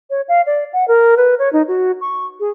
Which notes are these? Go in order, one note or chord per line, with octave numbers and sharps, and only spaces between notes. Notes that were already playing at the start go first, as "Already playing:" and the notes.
C#5
F5
D5
F#5
A#4
B4
C#5
D#4
F#4
C#6
G#4